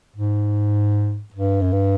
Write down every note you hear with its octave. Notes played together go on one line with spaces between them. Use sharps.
G#2
G2
F#2
G2